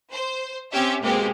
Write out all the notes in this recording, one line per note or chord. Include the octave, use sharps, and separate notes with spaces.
C5
C4 C#4 G4 E5
B2 G#3 A#3 C4 G4